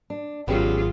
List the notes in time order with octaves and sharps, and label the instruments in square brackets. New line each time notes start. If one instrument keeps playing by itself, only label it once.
[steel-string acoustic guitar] D4
[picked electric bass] G#1 [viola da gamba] F#3 F4 [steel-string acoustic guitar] B3 C#4 G4 [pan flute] G#4